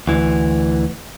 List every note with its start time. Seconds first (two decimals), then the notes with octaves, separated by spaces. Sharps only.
0.08 D2 E3